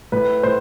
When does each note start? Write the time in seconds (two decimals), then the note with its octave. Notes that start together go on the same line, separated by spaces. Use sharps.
0.12 A2 B4
0.43 A2 C5